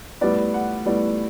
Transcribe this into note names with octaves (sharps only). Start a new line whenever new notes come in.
A2 G3 B3 D5
F#5
A2 G3 B3 D5